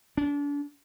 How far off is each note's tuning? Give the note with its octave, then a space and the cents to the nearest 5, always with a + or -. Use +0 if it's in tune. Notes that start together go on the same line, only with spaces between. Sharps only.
D4 -35